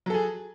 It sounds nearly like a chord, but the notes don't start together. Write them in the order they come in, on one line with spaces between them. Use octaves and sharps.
F#3 A4 G#4